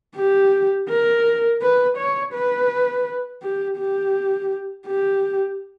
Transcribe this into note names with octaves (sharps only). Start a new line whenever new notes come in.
G4
A#4
B4
C#5
B4
G4
G4
G4